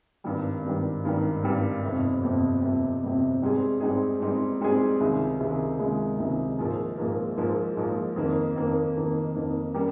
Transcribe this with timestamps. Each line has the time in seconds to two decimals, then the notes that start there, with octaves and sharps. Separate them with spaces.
0.24 G#1 G2 D#3 G3
0.64 G#1 G2 D#3 G3
1.04 G#1 G2 D#3 G3
1.43 G#1 G2 D#3 G3
1.83 G1 F2 C3
2.23 G1 F2 C3
2.62 G1 F2 C3
3.02 G1 F2 C3
3.42 G#2 G3 C4 D#4 G#4
3.80 G#2 G3 C4 D#4 G#4
4.20 G#2 G3 C4 D#4 G#4
4.60 G#2 G3 C4 D#4 G#4
5.00 C#2 C3 D#3 G#3 D#4
5.39 C#2 C3 D#3 G#3 D#4
5.79 C#2 C3 D#3 G#3 D#4
6.18 C#2 C3 D#3 G#3 D#4
6.59 A#1 G#2 F3 A#3
6.98 A#1 G#2 F3 A#3
7.37 A#1 G#2 F3 A#3
7.77 A#1 G#2 F3 A#3
8.16 F2 D#3 A#3
8.56 F2 D#3 A#3
8.96 F2 D#3 A#3
9.35 F2 D#3 A#3
9.74 G3 C#4 G4 A#4